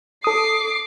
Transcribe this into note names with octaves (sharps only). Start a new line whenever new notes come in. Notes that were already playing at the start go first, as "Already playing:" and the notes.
A4 D6 D#6 C7